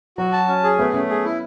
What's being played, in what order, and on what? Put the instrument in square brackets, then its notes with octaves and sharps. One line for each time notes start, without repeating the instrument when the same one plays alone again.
[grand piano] F#3 [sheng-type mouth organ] F#4
[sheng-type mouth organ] A5
C#4
G#4
[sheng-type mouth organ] A3 [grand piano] B3
[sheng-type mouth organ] A3 [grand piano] C#4
[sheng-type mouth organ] G#4
E4